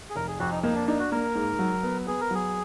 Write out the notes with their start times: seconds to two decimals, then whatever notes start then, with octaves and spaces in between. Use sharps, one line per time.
0.10 G#4
0.16 F1 A#4
0.28 G#4
0.39 F2 F#4
0.52 D#4
0.63 A#3 D#4
0.75 D4
0.88 D4 D#4
0.99 F#4
1.11 A#3 A#4
1.35 G#2
1.59 F#3
1.83 B3
2.07 B3 G#4
2.21 A#4
2.31 F#3 G#4